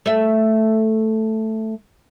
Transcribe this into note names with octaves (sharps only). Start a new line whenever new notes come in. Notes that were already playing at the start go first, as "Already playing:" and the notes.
A3 E5